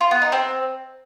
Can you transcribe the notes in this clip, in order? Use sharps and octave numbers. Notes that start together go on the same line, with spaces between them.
F4
B3
D#4
C4